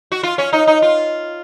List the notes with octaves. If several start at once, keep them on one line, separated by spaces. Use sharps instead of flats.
F#4
F4
C#4
D#4
D#4
F4